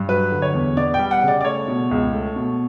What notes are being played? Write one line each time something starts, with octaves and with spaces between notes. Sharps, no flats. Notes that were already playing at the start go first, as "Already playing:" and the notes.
Already playing: G2
F#3 B4
D3
C#5
E2
B3 D5
G5
G3
F#5
C#3 D5
D5
A3 C#5
B2
C#2
A3
B2